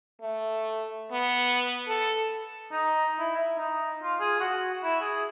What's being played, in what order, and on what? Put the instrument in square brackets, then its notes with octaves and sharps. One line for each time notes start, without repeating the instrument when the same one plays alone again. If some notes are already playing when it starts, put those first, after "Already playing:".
[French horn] A3
B3
A4
[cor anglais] D#4
E4
E5
D#4
F4
G#4
F#4
E4
G#4